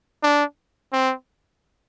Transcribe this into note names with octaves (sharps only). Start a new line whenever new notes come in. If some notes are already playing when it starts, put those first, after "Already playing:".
D4
C4